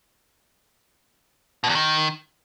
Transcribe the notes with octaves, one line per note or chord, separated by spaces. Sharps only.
B2
E2
D#3